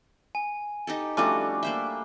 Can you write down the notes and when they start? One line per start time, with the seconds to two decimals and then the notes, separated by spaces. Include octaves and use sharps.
0.35 G#5
0.87 D#4 G4 A4
1.17 F3 G3 A3 C#4 D4 F#4 G#5 D6
1.63 A#3 C5 E5